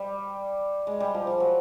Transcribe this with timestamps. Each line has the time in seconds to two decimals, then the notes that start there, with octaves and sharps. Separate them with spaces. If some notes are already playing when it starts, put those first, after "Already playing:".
Already playing: G3
0.87 G#3
1.00 G3
1.14 F3
1.27 F3
1.40 F#3